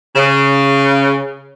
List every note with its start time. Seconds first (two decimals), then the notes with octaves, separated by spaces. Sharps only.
0.15 C#3